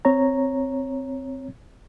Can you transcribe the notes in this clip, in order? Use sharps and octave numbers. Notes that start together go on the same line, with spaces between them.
C4 C#5 A#5